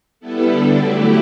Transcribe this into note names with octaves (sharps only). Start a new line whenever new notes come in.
G3 B3 E4 A4
D3 G3 D4 A4
F#3 A3 E4 G4